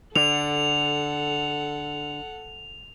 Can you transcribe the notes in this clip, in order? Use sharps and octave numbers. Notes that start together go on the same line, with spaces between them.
D3 A4 F#5 F7